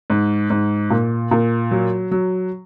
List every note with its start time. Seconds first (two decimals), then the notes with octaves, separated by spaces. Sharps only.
0.10 G#2
0.50 G#2
0.90 A#2
1.31 A#2
1.71 F#3
2.11 F#3